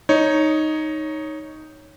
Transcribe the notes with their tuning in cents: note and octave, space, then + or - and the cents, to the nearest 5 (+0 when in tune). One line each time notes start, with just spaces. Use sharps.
D#4 +0 C#5 +0